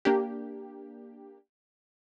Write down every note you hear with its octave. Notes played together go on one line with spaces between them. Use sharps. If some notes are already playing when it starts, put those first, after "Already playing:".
A#3 D4 G4